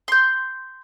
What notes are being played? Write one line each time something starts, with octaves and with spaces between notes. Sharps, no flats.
C6 G6